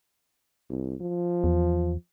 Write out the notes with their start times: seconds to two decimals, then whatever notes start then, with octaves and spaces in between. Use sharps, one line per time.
0.69 C2
1.01 F3
1.44 E2